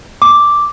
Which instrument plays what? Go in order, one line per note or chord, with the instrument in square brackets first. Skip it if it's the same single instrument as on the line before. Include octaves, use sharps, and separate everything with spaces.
[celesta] D6